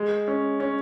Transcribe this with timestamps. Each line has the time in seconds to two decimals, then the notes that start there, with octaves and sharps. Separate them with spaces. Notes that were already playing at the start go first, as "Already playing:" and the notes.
Already playing: G#3
0.28 C#4
0.60 C#4